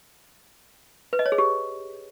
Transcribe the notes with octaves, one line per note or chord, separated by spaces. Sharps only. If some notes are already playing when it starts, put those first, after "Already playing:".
B4
D#5
C#5
G#4
G4